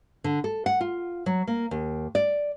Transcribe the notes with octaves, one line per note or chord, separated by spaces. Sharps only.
D3
A4
F#5
F4
F#3
A#3
D#2
D5